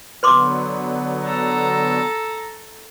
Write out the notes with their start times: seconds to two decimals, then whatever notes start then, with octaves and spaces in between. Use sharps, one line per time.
0.23 D3 F#3 B3 B4 C6 D6
1.23 A4 A#5